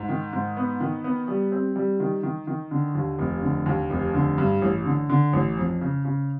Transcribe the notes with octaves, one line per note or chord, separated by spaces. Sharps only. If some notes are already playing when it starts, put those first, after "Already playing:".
Already playing: G#2
D#3
G#2
B3
D#3
B3
G3
C4
G3
D#3
D#3
D#3
D3
D#2
F1
D3
D#2
F1
D3
G2
A1
D3
D3
A1
F2
C#3
C#3